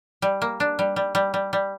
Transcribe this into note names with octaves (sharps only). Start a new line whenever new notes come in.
G3
A#3
D4
G3
G3
G3
G3
G3